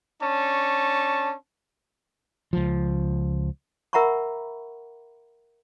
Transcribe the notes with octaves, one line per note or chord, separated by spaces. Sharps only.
C#4 D4 A5 C#6
C#2 F3
A#4 E5 F#5 A#5 B5 C#6